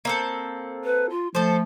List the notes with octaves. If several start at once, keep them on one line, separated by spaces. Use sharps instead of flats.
A#3 C4 A4
B4
F4
F3 A3 A4 C5